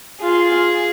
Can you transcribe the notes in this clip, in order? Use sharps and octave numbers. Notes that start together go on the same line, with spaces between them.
F4 G#4